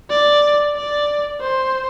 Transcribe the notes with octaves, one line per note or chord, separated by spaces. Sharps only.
D5
D5
C5